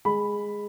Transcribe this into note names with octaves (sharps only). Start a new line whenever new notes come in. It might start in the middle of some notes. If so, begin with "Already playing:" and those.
G#3 B5